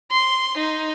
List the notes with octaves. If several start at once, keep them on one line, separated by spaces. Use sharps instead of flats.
C6
D#4